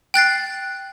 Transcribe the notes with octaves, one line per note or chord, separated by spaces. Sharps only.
G5 F#6 A6 C7